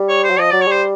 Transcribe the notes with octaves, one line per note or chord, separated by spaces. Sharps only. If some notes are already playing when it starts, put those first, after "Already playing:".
Already playing: G3
C#5
C5
F#3
F3 D#5
F#3 D5
C#5
G3 C5